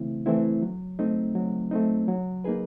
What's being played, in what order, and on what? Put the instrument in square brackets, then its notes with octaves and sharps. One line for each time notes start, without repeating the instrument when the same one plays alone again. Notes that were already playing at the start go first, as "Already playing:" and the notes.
Already playing: [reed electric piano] C#3 E3 A3 C4 E4
E3 A3 C4 E4
F#3
A3 C4 D#4
F#3
A3 C4 D#4
F#3
A#3 D#4 G#4 B4